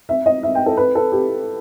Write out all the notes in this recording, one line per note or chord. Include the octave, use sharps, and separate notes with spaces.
E5
D#5
E5
G5
A4
B4
A4
G4